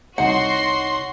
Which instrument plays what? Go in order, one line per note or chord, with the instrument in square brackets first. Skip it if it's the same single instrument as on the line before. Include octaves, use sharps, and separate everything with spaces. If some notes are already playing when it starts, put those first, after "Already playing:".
[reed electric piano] C2 D#4 C#5 [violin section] F#4 C6 [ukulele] F#5